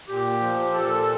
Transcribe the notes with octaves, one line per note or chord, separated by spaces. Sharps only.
A#2 G4
F3
A#2 A4